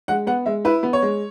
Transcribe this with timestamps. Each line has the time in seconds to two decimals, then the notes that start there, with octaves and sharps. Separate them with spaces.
0.08 G#3 F#5
0.27 B3 F#5
0.46 G#3 E5
0.65 E4 B4
0.83 B3
0.93 C#5
1.03 G#3